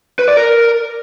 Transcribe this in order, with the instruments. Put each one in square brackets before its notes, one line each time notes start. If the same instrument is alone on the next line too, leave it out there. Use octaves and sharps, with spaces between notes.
[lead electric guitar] B4
D5
A#4